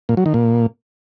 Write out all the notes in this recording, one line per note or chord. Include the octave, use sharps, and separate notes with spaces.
A#2
F#3
D#3
A#2